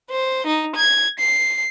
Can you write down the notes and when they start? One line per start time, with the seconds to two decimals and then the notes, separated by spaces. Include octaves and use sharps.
0.10 C5
0.47 D#4
0.76 G#6
1.19 C7